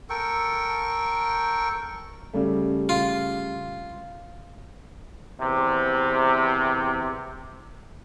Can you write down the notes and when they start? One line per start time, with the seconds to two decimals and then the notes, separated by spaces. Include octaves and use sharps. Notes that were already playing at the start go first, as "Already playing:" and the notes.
0.10 A4 A#4 G5 C#6
2.33 C#3 G3 A3
2.89 F4
5.41 E2 C3